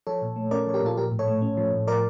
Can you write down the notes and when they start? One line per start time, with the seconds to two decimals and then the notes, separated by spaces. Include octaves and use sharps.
0.07 F3 A4 C#5
0.22 A#2
0.36 A3
0.51 C#4 A#4 D5
0.67 F3 C#5
0.74 G4 A#4
0.82 A#2 F4 A4
0.97 F3 G4 A#4
1.12 A2
1.19 A4 C#5
1.28 A3
1.42 C#4
1.57 F3
1.73 A2
1.88 F3 A#4 D5